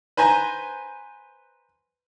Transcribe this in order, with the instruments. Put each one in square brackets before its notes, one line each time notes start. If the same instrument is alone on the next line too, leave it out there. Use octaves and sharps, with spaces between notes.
[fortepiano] B4 C5 G#5 A#5